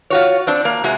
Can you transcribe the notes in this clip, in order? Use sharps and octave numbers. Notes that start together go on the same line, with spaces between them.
F4 F#4 C#5
C4 D4
A#3
C3 G#3 F#4